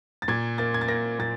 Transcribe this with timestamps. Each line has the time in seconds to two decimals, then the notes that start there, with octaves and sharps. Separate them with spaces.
0.22 A6
0.28 A#2 G#6
0.58 A#3 A6
0.74 G#6
0.81 A6
0.88 A#3 A#6
1.19 A#2 A6